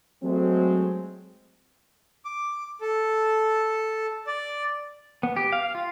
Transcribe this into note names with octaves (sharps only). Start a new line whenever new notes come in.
F#3 G#3 A3 C4
D6
A4
D5
B3
G4
F5
F4